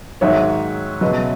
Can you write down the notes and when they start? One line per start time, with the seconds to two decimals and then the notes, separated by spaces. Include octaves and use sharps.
0.21 G#2 D#3 F#3 A#3 D#4 C#5 E5
1.01 C#2 B2 F#3 B4 D#5